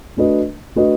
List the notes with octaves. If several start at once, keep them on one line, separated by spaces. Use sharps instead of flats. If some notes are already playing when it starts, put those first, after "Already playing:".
A3 D4 F#4 B4 D#5
A3 D4 F#4 B4 D#5